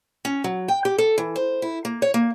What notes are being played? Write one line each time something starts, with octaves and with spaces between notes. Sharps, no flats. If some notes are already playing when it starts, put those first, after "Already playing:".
C#4
F#3
G5
G4
A4
E3
C5
E4
A#3
C#5
A#3